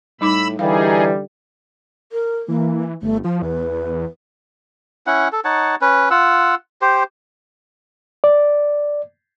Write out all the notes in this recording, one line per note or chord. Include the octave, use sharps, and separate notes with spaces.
A2 G3 D#4 B5 D6 E6
D3 E3 G3 D#4 G#4 F5
A#4
E3 A#3
G1 A3
F3 F4
E2 B4
C#4 E4 F#5
A4
D#4 C#5 F#5 A5
C#4 B4
F4 F#5 E6
G4 C5
D5